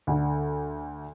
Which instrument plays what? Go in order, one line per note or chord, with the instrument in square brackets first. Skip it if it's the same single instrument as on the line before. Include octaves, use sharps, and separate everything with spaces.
[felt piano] D2 D3